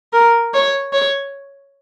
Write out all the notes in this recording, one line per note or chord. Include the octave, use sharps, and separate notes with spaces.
A#4
C#5
C#5